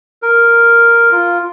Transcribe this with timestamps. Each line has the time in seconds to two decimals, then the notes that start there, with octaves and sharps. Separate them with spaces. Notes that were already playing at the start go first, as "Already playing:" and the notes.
0.22 A#4
1.12 F4